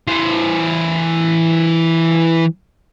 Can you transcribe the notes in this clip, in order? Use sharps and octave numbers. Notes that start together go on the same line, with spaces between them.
E3 C5